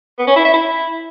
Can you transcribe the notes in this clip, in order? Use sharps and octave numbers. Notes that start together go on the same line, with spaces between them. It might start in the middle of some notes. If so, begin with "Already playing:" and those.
B3
C#4
E4
E5
E4